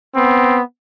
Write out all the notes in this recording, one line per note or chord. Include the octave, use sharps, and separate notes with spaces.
B3 C4